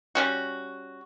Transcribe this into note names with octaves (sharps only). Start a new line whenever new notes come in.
G3 C#4 F#4